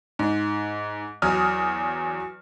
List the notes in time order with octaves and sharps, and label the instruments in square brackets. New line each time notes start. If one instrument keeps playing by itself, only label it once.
[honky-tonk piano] G#2
E2 F#3 D#6 F6